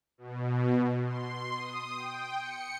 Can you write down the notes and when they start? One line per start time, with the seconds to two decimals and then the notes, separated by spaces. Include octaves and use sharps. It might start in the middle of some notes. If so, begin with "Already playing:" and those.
0.18 B2
1.04 C6
1.54 D#6
1.96 G5
2.36 C#7